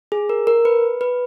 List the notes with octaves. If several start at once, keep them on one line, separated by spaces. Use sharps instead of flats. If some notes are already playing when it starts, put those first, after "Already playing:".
G#4
A#4
A#4
B4
B4